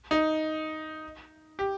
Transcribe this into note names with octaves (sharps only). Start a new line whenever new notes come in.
D#4
G4